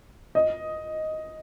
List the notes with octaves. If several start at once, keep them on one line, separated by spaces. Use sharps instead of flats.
D#5